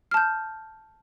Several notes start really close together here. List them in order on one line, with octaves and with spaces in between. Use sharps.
F6 A5 G6